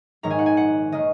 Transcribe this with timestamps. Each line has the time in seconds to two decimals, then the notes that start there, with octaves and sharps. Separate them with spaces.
0.23 A#1 G#2 D#3 G#3 C#4 A#5
0.30 G#5
0.39 F#5
0.46 G#5
0.57 F#5
0.92 D#3 A#3 C#4 D#5